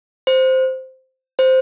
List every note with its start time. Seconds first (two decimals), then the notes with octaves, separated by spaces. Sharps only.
0.27 C5
1.39 C5